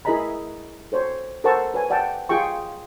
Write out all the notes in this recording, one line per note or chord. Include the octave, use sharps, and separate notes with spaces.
E4 G#4 A#4 D#5 A#5 B5
A4 C5 C#5
A4 A#4 C5 F#5 A5 C#6
B4 C#5 G#5
D5 F#5 G5 A5
F4 G#4 G5 C#6